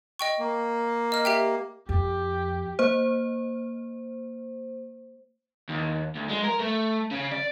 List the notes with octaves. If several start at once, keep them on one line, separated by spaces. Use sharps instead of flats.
D#5 G5 C#6
A#3
D#5 F6
G4 E5 G5
F2 G4
A#3 C5
D#2
D2
G#3
A#4
A3
C#3
D5